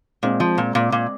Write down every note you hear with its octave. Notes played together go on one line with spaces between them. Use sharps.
A#2 G#3 C4
F3
A#2
A#2
A#2